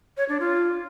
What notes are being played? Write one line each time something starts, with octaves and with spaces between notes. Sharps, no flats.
C#5
D4
F4